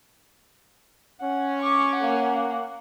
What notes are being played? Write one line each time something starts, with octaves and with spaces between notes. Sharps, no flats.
C#4 F#5
C#6 D6
A#3 F#5